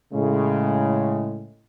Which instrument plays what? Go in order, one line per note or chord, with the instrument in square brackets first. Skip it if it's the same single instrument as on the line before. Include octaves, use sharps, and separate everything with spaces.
[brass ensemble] A2 C#3 G#3